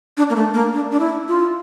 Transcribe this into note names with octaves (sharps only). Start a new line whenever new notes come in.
D4
A#3
A3
A#3
D4
D4
E4
F4